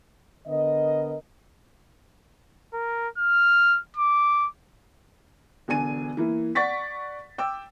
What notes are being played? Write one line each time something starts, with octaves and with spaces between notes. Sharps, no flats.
D3 B3 A#4 D#5
A#4
F6
D6
E1 D3 D4 G#5 D#7
E3 A#3 E4
D5 F#5 C#6 A6 B6
G5 D6 E6